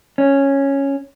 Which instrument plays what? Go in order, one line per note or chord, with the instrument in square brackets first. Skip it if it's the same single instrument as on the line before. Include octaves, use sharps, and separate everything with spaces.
[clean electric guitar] C#4